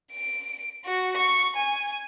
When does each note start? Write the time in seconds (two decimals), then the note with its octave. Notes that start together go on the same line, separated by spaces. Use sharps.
0.12 D7
0.85 F#4
1.17 C#6
1.56 G#5